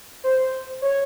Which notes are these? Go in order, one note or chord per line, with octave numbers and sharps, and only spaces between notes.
C5
C#5